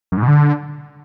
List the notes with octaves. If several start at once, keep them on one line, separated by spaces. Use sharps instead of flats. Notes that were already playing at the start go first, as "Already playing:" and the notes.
F#2
G#2
B2
D3